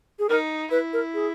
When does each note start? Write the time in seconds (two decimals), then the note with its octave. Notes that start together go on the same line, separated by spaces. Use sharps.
0.19 G#4
0.29 D#4 A#4
0.71 E4 B4
0.93 A#4
1.14 G#4